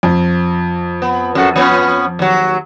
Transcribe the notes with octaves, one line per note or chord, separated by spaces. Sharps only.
F2
B3
F#2 F#4 A4
F3 B3 C#4
D#2 F#3